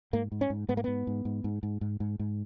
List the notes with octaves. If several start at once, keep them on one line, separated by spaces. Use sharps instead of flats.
G#2 A#3
G#2
C#4
G#2
G#2 B3
A#3
G#2 B3
G#2
G#2
G#2
G#2
G#2
G#2
G#2